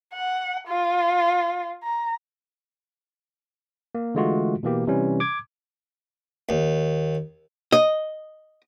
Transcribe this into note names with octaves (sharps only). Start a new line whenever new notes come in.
F#5
F4
A#5
A#3
D3 E3 G#3 A3 F4 F#4
B2 E3 A#3 G4
C3 E3 G3 C#4
D6 G#6
D#2
D#5